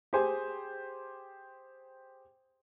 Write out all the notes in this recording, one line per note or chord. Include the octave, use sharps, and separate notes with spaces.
G4 G#4 C5 G#5